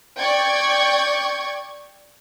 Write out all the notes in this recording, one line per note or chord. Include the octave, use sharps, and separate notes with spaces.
D5 G5 C#6 G#6